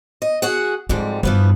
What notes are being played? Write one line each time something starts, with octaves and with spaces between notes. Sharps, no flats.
D#5
F#4 G#4 F#5
F2 G#2 G3 G#3
G2 E3 F3 B3